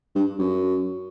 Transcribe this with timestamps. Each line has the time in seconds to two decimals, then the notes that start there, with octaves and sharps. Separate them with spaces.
0.16 G2
0.39 F#2